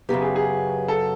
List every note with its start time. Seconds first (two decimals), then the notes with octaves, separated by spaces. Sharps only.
0.09 F#2 C#3 F#3 B3 G4
0.22 G#4
0.36 G#4
0.88 A4